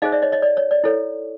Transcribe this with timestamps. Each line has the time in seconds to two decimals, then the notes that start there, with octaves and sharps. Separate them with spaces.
0.02 D#4 G#4 C5 D#5 F5
0.12 D5 E5
0.22 C#5 D#5
0.32 C#5 D#5
0.42 D5
0.57 C#5
0.71 D5
0.84 E4 A4 C#5